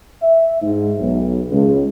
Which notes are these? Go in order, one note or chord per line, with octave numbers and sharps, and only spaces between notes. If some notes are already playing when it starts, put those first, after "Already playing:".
E5
G#2
B1
C#2